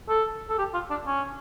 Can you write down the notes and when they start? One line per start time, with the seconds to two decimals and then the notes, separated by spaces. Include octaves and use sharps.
0.09 A4
0.49 A4
0.58 G4
0.74 F4
0.90 D4
1.07 C#4